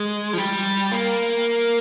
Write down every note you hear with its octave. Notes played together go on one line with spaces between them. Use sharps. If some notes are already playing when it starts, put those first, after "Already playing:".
Already playing: G#3
F3
G3
A#3